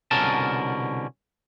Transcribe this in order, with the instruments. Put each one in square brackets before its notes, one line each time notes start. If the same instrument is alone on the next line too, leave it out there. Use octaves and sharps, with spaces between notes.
[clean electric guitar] C2 B2 D3 C#4 A#4 A5